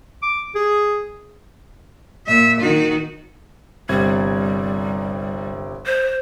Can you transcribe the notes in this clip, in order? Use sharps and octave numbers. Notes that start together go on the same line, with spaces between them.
D6
G#4
A#2 E5
D#3 F#4
G1 C3 G3 G#6
C5